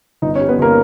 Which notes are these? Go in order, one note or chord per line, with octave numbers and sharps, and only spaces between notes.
G1 D#4 D#5
C#4 C#5
G3
B3 B4
G1 A#3 A#4